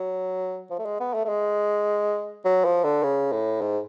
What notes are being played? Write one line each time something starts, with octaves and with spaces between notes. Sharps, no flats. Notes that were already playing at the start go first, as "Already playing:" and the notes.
Already playing: F#3
F3
A3
G#3
B3
A3
A3
G#3
F#3
F3
D3
C#3
A2
G#2